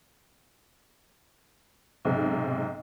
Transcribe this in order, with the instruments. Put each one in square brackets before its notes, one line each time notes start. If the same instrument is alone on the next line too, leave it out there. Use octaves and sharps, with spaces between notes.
[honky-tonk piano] B1 G#2 C3